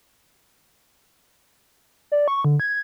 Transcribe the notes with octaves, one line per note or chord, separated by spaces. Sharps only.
D5
C#6
D3
G#6